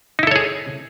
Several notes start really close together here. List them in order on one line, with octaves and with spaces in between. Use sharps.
D#4 E4 A4 C#5 G#4